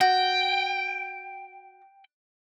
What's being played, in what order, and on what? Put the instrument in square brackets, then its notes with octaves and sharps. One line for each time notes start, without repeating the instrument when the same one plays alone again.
[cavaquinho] F#4 [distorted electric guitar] G5